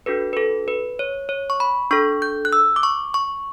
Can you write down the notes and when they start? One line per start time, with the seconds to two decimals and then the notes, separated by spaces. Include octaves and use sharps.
0.06 D4 F#4 A4 B4
0.33 B4
0.37 A4
0.68 B4
0.99 C#5
1.29 C#5
1.50 C#6
1.60 B5
1.91 D4 A4 C#6
2.22 G6
2.45 F#6
2.53 E6
2.76 D6
2.83 C#6
3.14 C#6